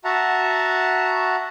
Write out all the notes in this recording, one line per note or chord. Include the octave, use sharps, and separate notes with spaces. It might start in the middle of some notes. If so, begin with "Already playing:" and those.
F#4 E5 F#5 A5 A#5